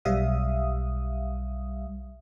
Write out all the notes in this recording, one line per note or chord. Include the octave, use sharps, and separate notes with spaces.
B1 G3 E5 F5 D#6